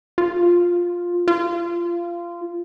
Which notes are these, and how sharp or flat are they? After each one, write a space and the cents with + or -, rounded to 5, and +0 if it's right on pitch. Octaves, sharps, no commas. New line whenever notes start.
F4 +5
F4 -20